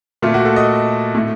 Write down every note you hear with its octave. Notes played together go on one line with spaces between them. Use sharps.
A#2 A3 F4
F#4
A4
D#5
A2 A3